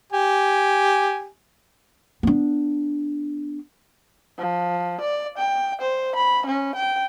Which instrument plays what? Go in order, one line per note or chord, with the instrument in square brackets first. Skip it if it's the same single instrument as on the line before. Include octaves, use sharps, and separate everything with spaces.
[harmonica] G4 G#5
[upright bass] B3 D4
[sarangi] F3
D5
G5
C5
B5
C#4
G5